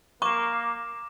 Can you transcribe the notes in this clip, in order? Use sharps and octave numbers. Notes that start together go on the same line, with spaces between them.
A#3 C#6 D6 E7